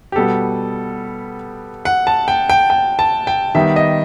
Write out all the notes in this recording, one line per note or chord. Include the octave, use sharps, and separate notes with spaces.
G4
B2 G3 B3 A4
F#5
A5
G5
G5
G5
A5
G5
D#3 G3 B3 E5
D#5